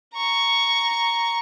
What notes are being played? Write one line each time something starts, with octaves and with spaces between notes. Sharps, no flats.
A#5 C#6